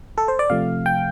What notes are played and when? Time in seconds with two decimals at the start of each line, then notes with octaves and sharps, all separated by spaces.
0.18 A4
0.28 C5
0.39 D5
0.50 C3 F3 A3 F5
0.86 G5